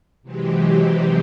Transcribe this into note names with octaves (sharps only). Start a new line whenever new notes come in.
C3 E3 F#3 G#3 C4 G4